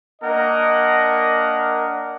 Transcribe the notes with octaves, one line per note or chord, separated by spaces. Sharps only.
A#3 D4 A#4 D#5 F#5